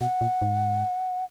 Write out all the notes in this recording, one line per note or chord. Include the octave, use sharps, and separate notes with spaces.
B2 F#5
A#2
G#2